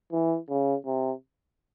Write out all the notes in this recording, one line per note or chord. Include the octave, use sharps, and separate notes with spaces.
E3
C#3
C3